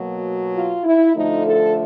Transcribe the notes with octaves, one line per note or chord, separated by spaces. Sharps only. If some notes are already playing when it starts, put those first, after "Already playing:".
Already playing: B2 F#3 A#3
F4
E4
D3 F3 A3 D#4
A4